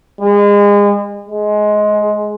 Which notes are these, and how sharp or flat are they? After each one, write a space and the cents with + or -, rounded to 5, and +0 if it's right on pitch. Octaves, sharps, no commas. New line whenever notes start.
G#3 -30
G#3 +15